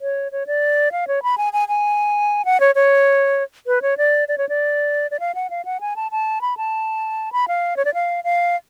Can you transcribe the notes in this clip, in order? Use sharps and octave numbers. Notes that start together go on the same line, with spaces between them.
C#5
C#5
D5
F5
C#5
B5
G#5
G#5
G#5
F#5
C#5
C#5
B4
C#5
D5
D5
C#5
D5
D5
F5
F#5
F5
F#5
G#5
A5
A5
B5
A5
B5
F5
C#5
D5
F5
F5